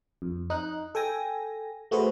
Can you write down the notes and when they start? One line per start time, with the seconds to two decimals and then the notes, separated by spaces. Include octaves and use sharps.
0.22 F2
0.50 D#4 F#6
0.95 A4 G5 G#5 A#6
1.91 A3 F#4 G#4 B4 C5